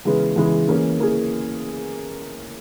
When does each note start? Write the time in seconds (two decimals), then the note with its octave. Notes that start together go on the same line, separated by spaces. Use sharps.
0.05 C#3 E3 G#3 B3
0.36 C#3 E3 G#3 B3
0.68 E3 A#3 C#4 G#4
0.98 E3 A#3 C#4 G#4